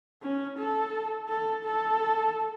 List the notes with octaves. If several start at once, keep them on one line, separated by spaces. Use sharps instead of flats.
C#4
A4
A4
A4